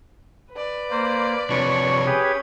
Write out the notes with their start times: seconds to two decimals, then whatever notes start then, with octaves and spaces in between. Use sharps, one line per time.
0.53 B4 D5
0.90 A#3 C5
1.50 C3 F3 D4 C#5 C#6
2.06 C#4 G4 G#4 B4